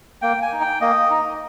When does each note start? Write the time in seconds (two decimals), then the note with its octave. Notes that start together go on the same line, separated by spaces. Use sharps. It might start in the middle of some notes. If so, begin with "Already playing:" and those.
0.22 A#3 G5
0.42 G#5
0.52 D#4
0.61 G5
0.81 A#3 D#5
1.10 D#4